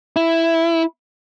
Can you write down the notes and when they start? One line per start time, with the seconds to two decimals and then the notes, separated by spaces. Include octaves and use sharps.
0.16 E4